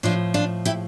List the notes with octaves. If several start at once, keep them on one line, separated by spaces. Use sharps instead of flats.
A2 F3 D4 F4
D4 F4
E4 G4